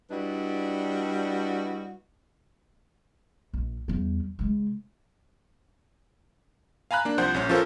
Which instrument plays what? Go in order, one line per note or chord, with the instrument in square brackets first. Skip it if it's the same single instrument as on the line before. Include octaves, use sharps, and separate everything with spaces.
[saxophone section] G3 D4 E4 F#4 B4 D#5
[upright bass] A#1
E2 G3
C#3 G#3
[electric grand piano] F5 G#5 A#5 B5 F#6
A#3 D4
C2 F3 C5 F#5 G6
A#1 C#4
F3 C#4 F4 A4 A#4 C5